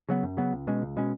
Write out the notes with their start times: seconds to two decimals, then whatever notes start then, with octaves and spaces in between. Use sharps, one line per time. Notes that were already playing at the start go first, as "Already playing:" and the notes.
0.09 C#3 F#3 B3
0.23 F#2
0.37 C#3 F#3 B3
0.53 C#2
0.67 B2 G#3 C#4
0.82 C#2
0.97 B2 G#3 C#4